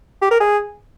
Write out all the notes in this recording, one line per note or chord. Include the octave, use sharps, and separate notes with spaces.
G4
A#4
G#4